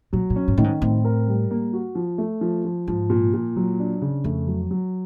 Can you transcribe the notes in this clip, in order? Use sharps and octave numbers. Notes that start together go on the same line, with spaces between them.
A#2 F#3
A#2
C#4
G#2
A2 D#3
G#2
A2 C4
A#4
G3
A#3
F#4
F3
A3
F3
F3
G#2 F3
A#2
A#2
F#3
D4
C#3
F2 A3
F#3
F#3